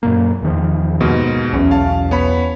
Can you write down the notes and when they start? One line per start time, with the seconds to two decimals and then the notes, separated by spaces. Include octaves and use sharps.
0.03 F#2 A#2 A#3
0.42 E2 D#3 F3
1.00 D#2 G#2 B2
1.53 B1 E2 C#4
1.71 F5 A5
2.11 B3 C#5 B5